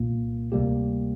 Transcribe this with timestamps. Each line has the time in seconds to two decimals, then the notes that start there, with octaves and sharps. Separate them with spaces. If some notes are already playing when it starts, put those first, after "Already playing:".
Already playing: C2 A#2 A#3
0.52 D2 C3 G3 A#3 G4